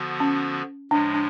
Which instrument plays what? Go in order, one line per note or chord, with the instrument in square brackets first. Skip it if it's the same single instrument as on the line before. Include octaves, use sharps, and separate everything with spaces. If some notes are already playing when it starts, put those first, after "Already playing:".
Already playing: [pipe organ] D3 F3 B3 F#4
[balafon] C#4
[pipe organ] A2 F3 G#3 [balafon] D4
[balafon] D4